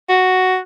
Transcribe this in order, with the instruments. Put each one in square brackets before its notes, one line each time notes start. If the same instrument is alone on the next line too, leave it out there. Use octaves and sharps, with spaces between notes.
[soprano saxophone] F#4